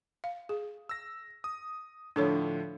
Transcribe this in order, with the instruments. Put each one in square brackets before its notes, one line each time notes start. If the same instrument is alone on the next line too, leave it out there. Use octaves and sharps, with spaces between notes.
[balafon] F5
G#4
[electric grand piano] E6 A#6
D#6
[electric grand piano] A2 D3 F3 [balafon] D4 A4 C#5